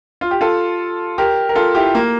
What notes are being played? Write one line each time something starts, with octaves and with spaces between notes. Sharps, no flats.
F4
G4
F4 A4
G4 A#4
A#4
F4 A4
E4 G4
A#3